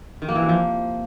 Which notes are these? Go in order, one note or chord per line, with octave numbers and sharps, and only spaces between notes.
D#3
A#3
E3
C3
F3